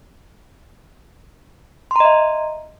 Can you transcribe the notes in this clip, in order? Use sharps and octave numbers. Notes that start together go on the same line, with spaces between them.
D#5 E5 A#5 C6